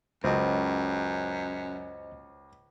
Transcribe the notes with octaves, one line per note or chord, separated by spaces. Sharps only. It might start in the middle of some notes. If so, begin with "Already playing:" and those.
C#2 F#2 C5 D#5